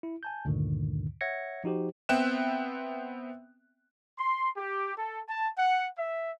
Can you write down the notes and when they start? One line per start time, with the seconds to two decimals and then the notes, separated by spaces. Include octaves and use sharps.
0.03 E4
0.23 G#5 A5 G6
0.45 D2 G2 A#2 D3 D#3
1.21 C#5 E5 F#5 G#6 A#6 C#7
1.64 F3 D#4 F#4 G4 C5
2.09 B3 C4 E5 G5 F#6 E7
4.18 C6
4.57 G4
4.97 A4
5.28 A5
5.57 F#5
5.97 E5